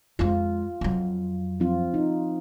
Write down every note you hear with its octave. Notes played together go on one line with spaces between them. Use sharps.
F2 G#3 F4
F2 F#3
F3 C4 F4
D#4